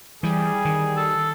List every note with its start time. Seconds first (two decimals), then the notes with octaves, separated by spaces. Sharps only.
0.23 E3 G3 G#4
0.65 D#3
0.97 A4